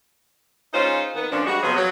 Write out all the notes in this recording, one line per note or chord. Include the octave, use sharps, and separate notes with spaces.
G#3 C#4 D#4 F4 C5
D#3 B3
A#2 F3 C#4 D4
G3 G#3 F#4
C3 F3 F#3 B3 G#4
F#3